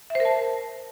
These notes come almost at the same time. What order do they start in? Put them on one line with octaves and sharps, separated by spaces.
E5 C5 A#4 A5